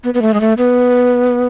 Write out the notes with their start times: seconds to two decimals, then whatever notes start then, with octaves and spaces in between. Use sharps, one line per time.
0.04 B3
0.14 B3
0.22 A3
0.34 G#3
0.41 A3
0.58 B3